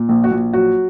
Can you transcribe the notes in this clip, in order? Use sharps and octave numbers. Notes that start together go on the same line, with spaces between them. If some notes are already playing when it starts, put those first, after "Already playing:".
Already playing: A#2
A#1
F#4
A#1
F#3 F#4